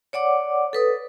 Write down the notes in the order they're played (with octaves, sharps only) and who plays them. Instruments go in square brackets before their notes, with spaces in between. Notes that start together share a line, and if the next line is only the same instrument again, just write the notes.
[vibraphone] C#5 D5 F#5 D6
A4 B4 D#6